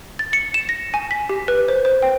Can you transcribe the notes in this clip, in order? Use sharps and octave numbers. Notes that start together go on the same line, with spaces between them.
A6
C#7
E7
A#6
G#5
B6
G4
B4
C5
C5
G5